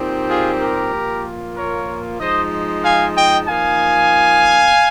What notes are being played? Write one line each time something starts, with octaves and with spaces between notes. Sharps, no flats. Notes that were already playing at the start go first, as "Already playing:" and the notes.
Already playing: A#2 G3 C4 D#4
F4 G#4
G4 A#4
A#2 F3 A#3 F4
A#4 C#5
F3 G#3 D#4 C5 D#5
F5 G#5
D#5 G5
F3 A#3 D#4 F5 G#5